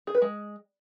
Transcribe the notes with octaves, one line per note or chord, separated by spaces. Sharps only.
G#4
B4
G#3